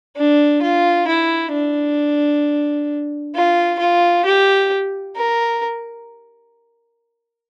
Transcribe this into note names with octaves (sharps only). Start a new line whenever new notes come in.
D4
F4
E4
D4
F4
F4
G4
A#4